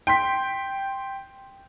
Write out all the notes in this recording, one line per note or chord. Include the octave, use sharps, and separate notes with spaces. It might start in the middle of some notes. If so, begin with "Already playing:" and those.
G5 C6 B6